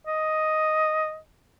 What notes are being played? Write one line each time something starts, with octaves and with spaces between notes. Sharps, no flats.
D#5